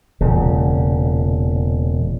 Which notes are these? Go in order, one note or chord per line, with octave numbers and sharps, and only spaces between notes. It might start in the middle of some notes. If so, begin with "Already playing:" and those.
E1 A#2 C#3